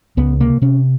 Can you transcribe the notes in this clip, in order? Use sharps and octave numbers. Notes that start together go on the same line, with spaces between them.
C#2 B3
C3 A#3
C3 C#4